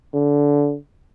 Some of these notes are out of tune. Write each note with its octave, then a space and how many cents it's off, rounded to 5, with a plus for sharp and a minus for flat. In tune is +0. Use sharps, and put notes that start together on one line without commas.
D3 -20